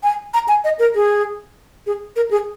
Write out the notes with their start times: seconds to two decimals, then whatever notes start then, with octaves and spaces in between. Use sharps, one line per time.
0.03 G#5
0.34 A#5
0.48 G#5
0.64 D#5
0.79 A#4
0.95 G#4
1.86 G#4
2.16 A#4
2.31 G#4